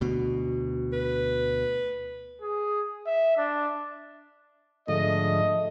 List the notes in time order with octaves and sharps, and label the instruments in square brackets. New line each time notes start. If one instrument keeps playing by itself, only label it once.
[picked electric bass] D2 B2
[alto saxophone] B4
[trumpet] G#4
E5
D4
[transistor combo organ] G#2 D3 F3 [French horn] A3 [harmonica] D#5